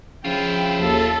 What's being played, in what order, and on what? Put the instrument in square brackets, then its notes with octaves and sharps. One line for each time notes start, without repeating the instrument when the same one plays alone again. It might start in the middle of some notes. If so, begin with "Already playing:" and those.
[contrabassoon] C#3 [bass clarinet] F3 [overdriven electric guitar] E4 F4 [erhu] G5
[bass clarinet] D#2 [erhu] A4